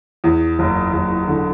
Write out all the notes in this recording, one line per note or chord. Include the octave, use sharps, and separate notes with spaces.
E2
F#1
F#1
D3